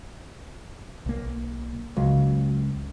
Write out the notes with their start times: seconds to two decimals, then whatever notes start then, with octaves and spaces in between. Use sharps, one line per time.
1.06 B1 A#3
1.97 C#2 F#3